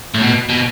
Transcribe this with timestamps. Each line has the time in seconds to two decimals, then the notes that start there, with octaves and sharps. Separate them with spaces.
0.14 A2
0.21 B2
0.49 B2